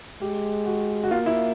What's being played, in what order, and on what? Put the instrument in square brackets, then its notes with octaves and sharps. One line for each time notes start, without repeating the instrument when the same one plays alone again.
[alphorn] G#3 [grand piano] G4
[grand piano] F#4
F#4
[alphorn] A#3 [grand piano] F4
[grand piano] E4